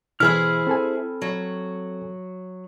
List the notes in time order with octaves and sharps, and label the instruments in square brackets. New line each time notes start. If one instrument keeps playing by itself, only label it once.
[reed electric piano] B2 E3 [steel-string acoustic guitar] E4 G#4 C5 [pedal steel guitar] B5 F6
[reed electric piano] C4 A4 G#5
[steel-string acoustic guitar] F#3